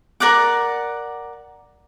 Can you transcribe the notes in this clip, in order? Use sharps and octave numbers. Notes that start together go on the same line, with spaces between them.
A#4 D5 F#5 D6